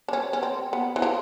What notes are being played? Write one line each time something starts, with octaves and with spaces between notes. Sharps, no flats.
D4
C#4
C#4
C4
B3
E3
F3